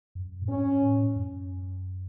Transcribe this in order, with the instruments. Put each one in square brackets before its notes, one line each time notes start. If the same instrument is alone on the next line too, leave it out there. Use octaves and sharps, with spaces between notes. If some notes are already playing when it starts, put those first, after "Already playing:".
[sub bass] F#2
A2
[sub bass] G#2 [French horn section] C#4
[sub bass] A2
F#2